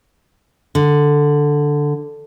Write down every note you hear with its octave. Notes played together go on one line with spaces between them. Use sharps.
D3